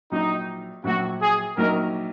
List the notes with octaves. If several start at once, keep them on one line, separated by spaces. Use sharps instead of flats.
A#1 A#2 F#3 D#4
A#1 A#2 F#3 F#4
G#4
A#1 A#2 F#3 D#4 A#4